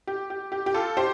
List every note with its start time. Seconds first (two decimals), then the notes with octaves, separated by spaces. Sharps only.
0.07 G4
0.30 G4
0.52 G4
0.66 G4
0.74 F4 A4
0.97 G4 C5